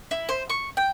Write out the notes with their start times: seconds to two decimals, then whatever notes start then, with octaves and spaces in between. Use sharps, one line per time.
0.11 E4
0.29 C5
0.50 C#6
0.77 G5